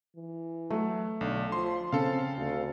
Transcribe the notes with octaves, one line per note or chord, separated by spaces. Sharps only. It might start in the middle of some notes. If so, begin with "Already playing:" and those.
E3
F#3 A3
B1 D3
F3 C6
C#3 C4 A4 F5
D2